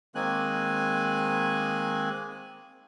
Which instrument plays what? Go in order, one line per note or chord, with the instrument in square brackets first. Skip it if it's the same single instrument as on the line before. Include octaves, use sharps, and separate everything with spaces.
[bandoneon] D#3 G#3 A#3 C4 G#5 F#6